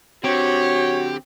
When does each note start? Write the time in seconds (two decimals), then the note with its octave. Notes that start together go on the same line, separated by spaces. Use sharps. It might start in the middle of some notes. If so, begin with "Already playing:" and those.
0.24 D3 C4 F#4 G4 C#5